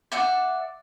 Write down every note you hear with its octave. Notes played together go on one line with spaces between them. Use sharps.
D5 E5 F#5